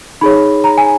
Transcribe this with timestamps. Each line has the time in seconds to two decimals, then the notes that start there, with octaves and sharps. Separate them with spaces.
0.21 D#4 G#4 C#5 B5
0.64 A#5
0.78 G#5